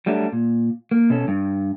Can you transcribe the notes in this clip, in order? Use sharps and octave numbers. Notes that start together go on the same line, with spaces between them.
F#3 G3 A3 D4
A#2
A#3
B2 C#4 A4
G2